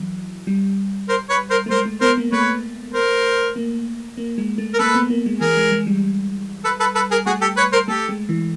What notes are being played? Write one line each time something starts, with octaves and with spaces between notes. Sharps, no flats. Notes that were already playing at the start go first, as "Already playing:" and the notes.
Already playing: E3 F#3
G3
A#4 C5
B4 C#5
A#4 C5
A3
G#3 A#4 C5
A3
B3 A#4 C5
A#3
A3 B4 C#5
A#4 C5
A#3
A#3
G#3
A3
A#4
A#3 A4 B4
B3
A#3
G#3
E3 G#4 A#4
G#3
G#3
G3
A4 B4
A4 B4
A4 B4
G#4 A#4
A3 F#4 G#4
G4 A4
B4 C#5
A#4 C5
A3 G4 A4
G#3
E3